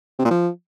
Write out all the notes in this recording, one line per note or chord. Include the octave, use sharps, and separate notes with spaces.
C3
A#2
F3